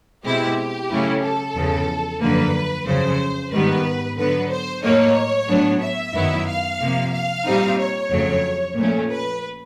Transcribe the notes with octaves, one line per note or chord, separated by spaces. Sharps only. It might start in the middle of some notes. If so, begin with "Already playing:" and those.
B2 G#3 C4 E4 G4
C#3 F#3 A3 C#4 E4
A4
E2 C#3 F3
F#2 D3 F3 A#3 B4
F2 C#3 F#3 C5
G#2 D#3 G3 B3 B4
D3 F#3 B3 B4
C5
A2 F#3 A#3 D#4 C#5
A2 F#3 B3 D4
E5
F#2 D#3 F#3 B3 E4
F5
C3 F3 A#3
F5
A#2 G3 C4 D#4
C#5
F2 C#3 F#3 A3
A#2 F3 A3 C#4
B4